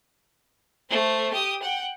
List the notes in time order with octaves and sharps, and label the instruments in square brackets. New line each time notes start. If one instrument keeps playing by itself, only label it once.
[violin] A3 C5
G4 D#6
F#5 G5